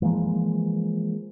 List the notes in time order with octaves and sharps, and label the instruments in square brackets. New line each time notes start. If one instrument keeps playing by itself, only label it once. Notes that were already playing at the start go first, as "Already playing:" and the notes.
[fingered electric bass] E3 F3 G#3 A#3